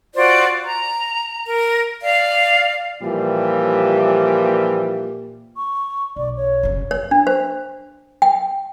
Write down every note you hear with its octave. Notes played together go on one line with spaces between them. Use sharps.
F4 F#4 C5 D5
A#5
A#4
D5 F5
A#2 E3 F3 G3 G4
C#6
B1 D5
C#5
F#1 C#3
C#5
D4
C5
G5